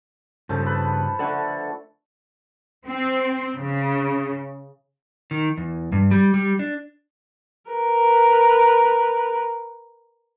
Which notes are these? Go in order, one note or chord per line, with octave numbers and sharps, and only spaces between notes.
G2 C#3 F3 A4
B4
D3 A3 A4 F#5
C4
C#3
D#3
E2
G2
G3
G3
D4
A#4 B4